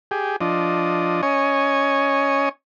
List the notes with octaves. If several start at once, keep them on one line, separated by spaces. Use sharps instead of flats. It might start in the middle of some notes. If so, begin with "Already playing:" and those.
G4 G#4
F3 D4 D#5
C#4 C#5 D#5 G#5